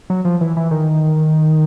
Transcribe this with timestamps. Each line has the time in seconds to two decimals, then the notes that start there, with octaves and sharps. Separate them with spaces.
0.10 F#3
0.25 F3
0.41 E3
0.57 E3
0.71 D#3